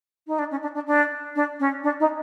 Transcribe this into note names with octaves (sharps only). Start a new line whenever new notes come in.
D#4
D4
C#4
D4
D4
D4
D4
C#4
D4
D#4